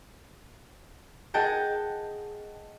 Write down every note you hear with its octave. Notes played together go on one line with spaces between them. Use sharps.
G#4 D#5 F#5 G5 A5